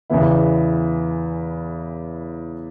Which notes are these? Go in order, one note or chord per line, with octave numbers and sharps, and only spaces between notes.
E2 C#3 E3 B3 E4